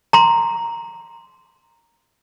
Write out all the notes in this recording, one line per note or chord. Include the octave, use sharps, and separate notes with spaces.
A#5 C6